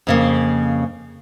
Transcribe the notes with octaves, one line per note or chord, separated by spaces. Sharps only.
F2 C#3 A#3